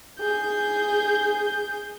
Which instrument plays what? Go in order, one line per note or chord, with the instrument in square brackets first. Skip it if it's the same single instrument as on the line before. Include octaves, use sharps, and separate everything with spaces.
[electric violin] G#4 G6